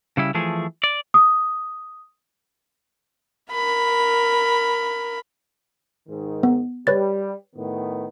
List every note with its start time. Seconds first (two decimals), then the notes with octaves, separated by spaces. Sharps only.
0.17 C#3 G3 E4
0.34 E3 F3 A3 G#4
0.84 D5
1.14 D#6
3.52 A#4 B5
6.08 G#2 D#3
6.43 B3
6.87 G3 B4 C#5 A6
7.55 A2 D#3 B3